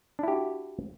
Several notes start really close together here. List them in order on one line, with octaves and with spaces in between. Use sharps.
D4 E4 G4 F#4